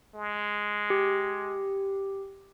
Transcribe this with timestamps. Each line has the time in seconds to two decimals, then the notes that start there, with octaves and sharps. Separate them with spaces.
0.14 G#3
0.90 G4